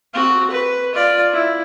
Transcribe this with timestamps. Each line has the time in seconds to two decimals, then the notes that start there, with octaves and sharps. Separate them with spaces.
0.14 C4 F#4
0.51 B4
0.94 F4 D5
1.33 E4